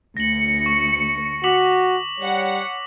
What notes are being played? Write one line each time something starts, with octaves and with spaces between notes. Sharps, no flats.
D2 A#6 C#7 F#7
C#6
F#4 D6 B6 F#7
G3 C#5 F#5